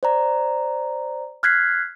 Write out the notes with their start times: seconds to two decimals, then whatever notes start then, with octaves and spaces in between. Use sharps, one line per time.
0.03 C5 D5 A#5
1.43 F6 F#6 G#6 B6 C7